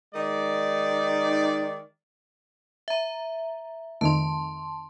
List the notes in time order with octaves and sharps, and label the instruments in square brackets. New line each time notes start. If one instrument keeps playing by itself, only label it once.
[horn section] D#3 G#3 D#4 D5
[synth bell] E5 A#5
[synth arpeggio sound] F2 D#3 A3 [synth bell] A5 C6